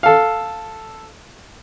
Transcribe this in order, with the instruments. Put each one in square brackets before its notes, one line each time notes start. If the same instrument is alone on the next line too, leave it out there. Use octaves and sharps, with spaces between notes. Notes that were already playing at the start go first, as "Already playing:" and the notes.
[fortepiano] A4 F5